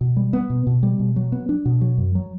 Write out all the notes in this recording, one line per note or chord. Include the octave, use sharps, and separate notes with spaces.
B2
G3
B3
B2
B2
G3
B2
F#3
B3
D4
B2
F#3
F#2
F#3